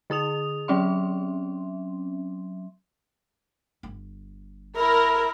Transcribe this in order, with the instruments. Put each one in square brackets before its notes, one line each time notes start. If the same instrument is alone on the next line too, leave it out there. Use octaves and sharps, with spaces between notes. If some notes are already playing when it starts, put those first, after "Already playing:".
[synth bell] D3 G#4 D#6 F7
F#3 C4 C#4 E5 C6
[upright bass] G1
[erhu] E4 [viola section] A#4